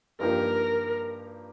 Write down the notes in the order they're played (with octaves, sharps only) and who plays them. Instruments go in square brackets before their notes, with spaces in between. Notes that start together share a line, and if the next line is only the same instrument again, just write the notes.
[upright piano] G2 F3 A#3 D#4 G4 [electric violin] A#4